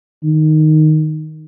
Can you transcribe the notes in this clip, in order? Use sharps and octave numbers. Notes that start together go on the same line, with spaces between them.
D#3